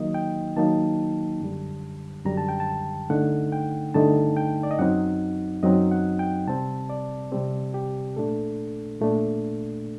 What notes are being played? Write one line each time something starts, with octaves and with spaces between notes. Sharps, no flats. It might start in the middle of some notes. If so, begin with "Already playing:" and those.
Already playing: D#3 F#3 A#3 D#4 D#5
G5
D#3 F#3 A#3 D#4 A5
F#2 D3 G3
F#2 D3 G3 A#5
A5
G5
A5
G2 D3 A3 D#4 F#5
G5
G2 D3 A3 D#4 A5
G5
D5
D#5
F#2 F#3 C4 D#4 F#5
F#2 F#3 C4 D#4 D#5
F#5
G5
C3 G3 C4 A5
D5
C3 G3 C4 G4
G4
A#2 A3 D4 A4
A#2 A3 D4